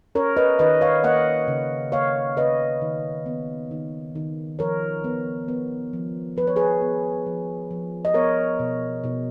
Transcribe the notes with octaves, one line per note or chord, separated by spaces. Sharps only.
C#4 A#4 C#5
B4 D#5
D#3 B4 D#5
C#5 F5
A#3 D#5 F#5
C#3
A#3 C#5 F5
C#3 B4 D#5
D#3
B3
D#3
D#3
F3 A#4 C#5
B3
B3
F3
F3 B4
C#5
G#4 B4
B3
F3
F3
D#5
B3 A#4 C#5
B2
B2